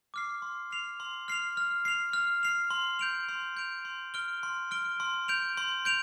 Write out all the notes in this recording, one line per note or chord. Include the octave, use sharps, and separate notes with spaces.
D6 F6 C7
C6
F6 C7 F7
C6
F6 C7 F7
F6
C7 F7
F6
C7 F7
C6
G6 D7 F7
C6
G6 D7 F7
C6
F6 D7 G7
C6
F6 D7 G7
C6
G6 D7 F7
C6
G6 D7 F7